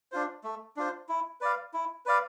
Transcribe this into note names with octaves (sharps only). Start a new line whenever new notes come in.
D4 F4 C5
A3
D4 F4 C5
E4
B4 D5 F5
E4
B4 D5 F5